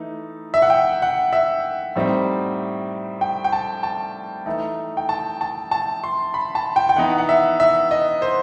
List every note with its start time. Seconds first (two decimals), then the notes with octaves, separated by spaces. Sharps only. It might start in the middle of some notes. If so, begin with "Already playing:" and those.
Already playing: E3 A3 D#4
0.54 E5
0.62 F#5
0.70 G5
1.02 F#5
1.33 E5
1.96 A2 G3 C4 D#4
3.21 G5
3.44 G5
3.52 A5
3.83 A5
4.46 E3 A3 D#4
4.97 G5
5.09 A5
5.41 A5
5.71 A5
6.04 C6
6.34 B5
6.55 A5
6.76 G5
6.89 G5
6.96 E3 B3 D#4 F#5
7.18 F#5
7.29 E5
7.60 E5
7.91 D#5
8.22 C5